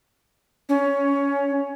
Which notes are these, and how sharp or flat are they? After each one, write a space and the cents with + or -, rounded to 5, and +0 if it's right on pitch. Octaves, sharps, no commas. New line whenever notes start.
C#4 +15